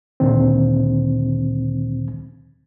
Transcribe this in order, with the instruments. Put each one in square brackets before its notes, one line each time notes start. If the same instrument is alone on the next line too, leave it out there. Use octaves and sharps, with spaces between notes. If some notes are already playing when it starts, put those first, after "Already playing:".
[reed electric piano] D2 A#2 D3 D#3 C4